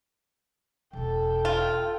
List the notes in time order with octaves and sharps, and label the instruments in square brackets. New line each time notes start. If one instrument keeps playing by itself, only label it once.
[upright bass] E1 D4 [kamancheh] A4 G5
[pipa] F4